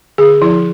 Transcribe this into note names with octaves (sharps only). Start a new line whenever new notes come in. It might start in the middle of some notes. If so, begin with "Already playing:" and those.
D3 G#4
F3 E4